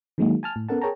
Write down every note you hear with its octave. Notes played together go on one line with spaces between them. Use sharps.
D#3 F#3 G#3 A#3 D#4
G#5 A5 F6
A2
B3 C#4 A4 A#4 F#5 A5
G#4 A#4 C#5 G5 A5 A#5